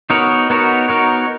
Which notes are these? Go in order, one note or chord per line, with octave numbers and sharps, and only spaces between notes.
B3 D#4 F#4 A#4 C#5
B3 D#4 F#4 A#4 C#5
B3 D#4 F#4 A#4 C#5